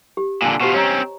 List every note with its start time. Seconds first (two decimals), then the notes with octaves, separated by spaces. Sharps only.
0.17 G4
0.42 A#2 D3 G#5 A5
0.60 B2 F4 G4 C5 C#6
0.74 C4 C#4 C#5 D#5 A#5